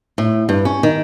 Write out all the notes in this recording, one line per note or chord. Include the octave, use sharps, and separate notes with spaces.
A2
G2
C#4
D#3